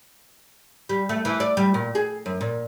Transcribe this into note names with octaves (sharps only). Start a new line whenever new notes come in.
G3
A3
E3
D5
G3
A#2
G#4
F#2
A#2